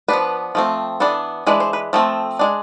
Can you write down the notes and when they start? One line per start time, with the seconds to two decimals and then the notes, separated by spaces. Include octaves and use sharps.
0.08 F3 B3 D4 B4
0.55 F3 A3 C4
1.00 E3 B3 D4 A4
1.47 E3 G#3 D4 B4
1.60 C5
1.73 B4
1.93 F3 A3 C4 A4
2.39 G#3 D4